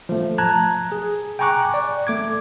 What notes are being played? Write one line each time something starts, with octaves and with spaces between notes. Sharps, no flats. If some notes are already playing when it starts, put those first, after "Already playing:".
F3 A3
A5 A#5 F#6 G#6
G#4
G5 G#5 A#5 C#6 D6 F#6
D5
A3 D6 G#6